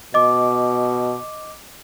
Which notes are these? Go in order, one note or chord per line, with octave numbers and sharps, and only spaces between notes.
B2 D#5 D6